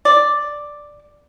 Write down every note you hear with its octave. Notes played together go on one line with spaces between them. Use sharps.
D5